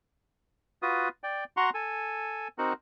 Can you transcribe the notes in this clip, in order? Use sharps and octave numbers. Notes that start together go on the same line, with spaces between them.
F4 F#4 B4 D#6
D5 G5
F#4 F#5 A#5 C6 C#6
A4 G#5
C4 D#4 F#4 A#4 F#5